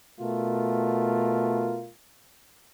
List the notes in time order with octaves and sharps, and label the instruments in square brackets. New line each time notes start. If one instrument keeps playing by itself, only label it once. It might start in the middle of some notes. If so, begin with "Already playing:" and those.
[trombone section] B2 A3 F4 A#4